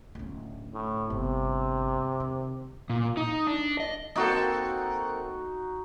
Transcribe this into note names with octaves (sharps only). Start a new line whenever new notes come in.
D1 C#4
A2
G1 C3
D#3
A#2
D#4
D4
D#5
A#3 C4 D#4 F#4 A4